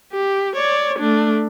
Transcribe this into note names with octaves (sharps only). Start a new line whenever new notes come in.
G4
C#5 D5
A3 D4